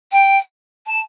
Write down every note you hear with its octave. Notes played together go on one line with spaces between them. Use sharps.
G5
A5